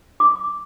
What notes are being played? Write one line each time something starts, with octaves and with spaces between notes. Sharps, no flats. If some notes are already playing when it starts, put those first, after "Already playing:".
D6